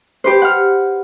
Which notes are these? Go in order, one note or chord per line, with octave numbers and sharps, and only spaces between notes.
G4 B4 C5
F#5 F6